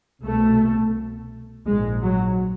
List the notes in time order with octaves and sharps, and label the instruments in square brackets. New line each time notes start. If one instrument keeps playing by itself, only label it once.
[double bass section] C2 B2 A3
A#1 G#2 G#3
F#3